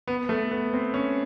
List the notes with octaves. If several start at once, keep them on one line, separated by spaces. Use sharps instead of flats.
B3
A3
B3
C4
C#4